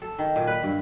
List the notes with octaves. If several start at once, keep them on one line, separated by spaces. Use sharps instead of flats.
A4
D#3
A#2
B4
G2